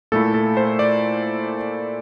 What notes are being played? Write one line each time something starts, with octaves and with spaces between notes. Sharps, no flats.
A#2 A3 E4 A4
A4
C5
D5